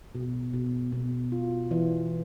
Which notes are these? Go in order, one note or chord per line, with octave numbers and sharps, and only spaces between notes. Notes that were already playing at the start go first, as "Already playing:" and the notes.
B2
B2
B2
F4
E3